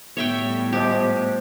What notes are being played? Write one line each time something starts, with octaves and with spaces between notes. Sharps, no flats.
A2 G3 B3 C#5 E5 G5
F3 G#3 G4